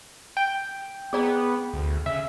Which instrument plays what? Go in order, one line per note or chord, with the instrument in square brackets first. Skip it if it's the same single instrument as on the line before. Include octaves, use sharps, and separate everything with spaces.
[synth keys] G5
[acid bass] B3 [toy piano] G#4 D5 A#5
[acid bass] D2
[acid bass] C#3 [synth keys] E5